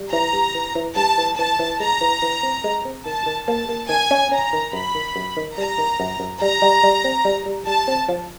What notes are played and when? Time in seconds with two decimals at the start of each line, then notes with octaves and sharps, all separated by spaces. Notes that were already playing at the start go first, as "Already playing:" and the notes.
Already playing: G3
0.12 E3 A#5
0.33 G2
0.54 E3
0.75 E3
0.96 G2 A5
1.18 E3
1.38 E3 A5
1.59 E3
1.80 G#3 A#5
2.01 E3
2.22 E3
2.43 C4
2.64 G#3
2.85 C4
3.06 D#3 A5
3.26 D#3
3.47 A#3 A5
3.69 A#3
3.89 D#3 G#5
4.11 C#4
4.31 C#4 A#5
4.53 D#3
4.73 F#2 B5
4.95 D#3
5.16 F#2
5.37 D#3
5.57 G3 A#5
5.78 D#3
6.00 F#2
6.20 F#2
6.41 G3 A#5
6.62 G3
6.83 G3
7.04 C4
7.25 G3
7.46 G3
7.66 G3 A5
7.88 C4
8.09 F3